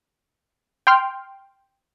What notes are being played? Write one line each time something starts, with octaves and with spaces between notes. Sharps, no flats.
G5 C6 F6